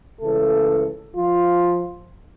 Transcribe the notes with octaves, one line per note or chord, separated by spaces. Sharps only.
C#2 C#3 E3 A3 A4
F3 F4